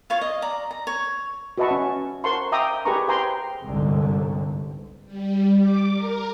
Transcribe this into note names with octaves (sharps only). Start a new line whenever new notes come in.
F4 C#5 F5
D#5
D5 A#5
A#5
C#5
F#4 B4 D#5 E5 A5 C#6
C#4
A#4 C5 F#5 A5 C6 C#6
E5 F5 G5 A#5 D6 D#6
G4 G#4 A#4 B4 A#5 C#6
B4 C5 G5 G#5 A#5 C6
G1 C2 G#2 D3
G3
D6
A#4